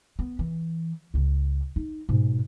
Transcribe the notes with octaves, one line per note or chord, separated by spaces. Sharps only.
B3
E3
C#2 C#3
D#4
G#2 B2